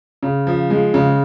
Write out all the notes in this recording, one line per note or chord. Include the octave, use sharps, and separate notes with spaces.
C#3
F3
G#3
C#3